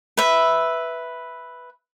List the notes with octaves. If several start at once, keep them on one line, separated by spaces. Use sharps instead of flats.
B4 E5